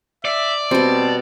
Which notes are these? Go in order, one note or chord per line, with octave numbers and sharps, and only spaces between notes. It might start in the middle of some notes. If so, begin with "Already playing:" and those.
D5 E5
B2 G3 C4 A5